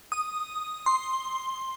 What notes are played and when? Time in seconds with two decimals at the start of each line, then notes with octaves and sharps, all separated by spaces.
0.12 D#6
0.86 C6